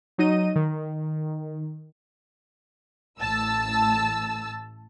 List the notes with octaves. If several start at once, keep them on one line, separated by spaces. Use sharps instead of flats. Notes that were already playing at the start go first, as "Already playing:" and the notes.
F#3 D#4 D#5 D#7
D#3
A1 A2 A5 E6